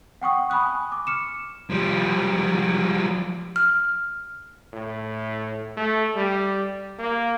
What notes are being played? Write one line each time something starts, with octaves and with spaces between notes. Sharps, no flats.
F#5 G5 C#6 D#6
G#5 B5 C#6 D#6 F#6
D6
F6 C#7 E7
F3 G3
F6
A2
A3
G3
A#3